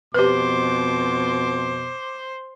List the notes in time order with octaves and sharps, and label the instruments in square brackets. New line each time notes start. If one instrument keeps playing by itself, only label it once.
[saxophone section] F2 B2 [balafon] G4 B4 [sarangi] C5 [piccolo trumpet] D6